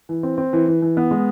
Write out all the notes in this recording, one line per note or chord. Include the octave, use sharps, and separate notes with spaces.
E3
C4
C4
E3
E3
E3
B3
G#3